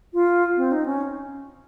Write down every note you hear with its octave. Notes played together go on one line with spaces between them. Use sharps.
F4
C4
D#4
C#4